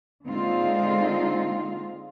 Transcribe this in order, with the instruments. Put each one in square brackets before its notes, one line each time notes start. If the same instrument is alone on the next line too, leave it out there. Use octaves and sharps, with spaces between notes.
[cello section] D3 G#3 A#3 C4 D#4 F4